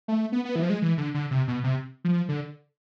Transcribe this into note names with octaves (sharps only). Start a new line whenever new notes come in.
A3
B3
B3
E3
F3
G#3
E3
D3
D3
C3
B2
C3
F3
D3